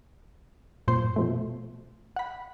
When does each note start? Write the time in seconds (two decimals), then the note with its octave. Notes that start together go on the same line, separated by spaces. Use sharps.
0.88 F#2 A#2 C5 C6
1.16 B2 F3 A3
2.16 F#5 B5